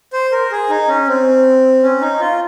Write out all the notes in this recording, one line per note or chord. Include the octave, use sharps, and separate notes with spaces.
C5
A#4
G#4
D#4
C#4
C4
C#4
D#4
F4